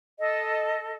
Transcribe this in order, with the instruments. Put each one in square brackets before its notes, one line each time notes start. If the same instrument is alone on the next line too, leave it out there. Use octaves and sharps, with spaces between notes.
[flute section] A4 D#5